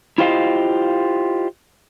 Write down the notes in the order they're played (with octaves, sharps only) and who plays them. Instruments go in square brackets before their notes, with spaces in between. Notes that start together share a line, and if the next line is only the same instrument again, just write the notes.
[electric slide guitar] E4 F4 G4 C5 D#5 F5